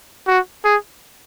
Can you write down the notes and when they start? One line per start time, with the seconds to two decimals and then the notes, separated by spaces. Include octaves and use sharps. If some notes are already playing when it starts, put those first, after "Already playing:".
0.28 F#4
0.65 G#4